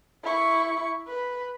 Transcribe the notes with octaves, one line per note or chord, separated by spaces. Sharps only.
E4 C#6
B4